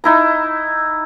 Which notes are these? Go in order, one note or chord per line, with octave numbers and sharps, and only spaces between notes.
D#4 E4 A#5